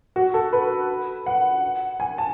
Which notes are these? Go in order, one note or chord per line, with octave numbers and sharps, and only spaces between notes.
F#4
A4
B4
F#5
G#5
A5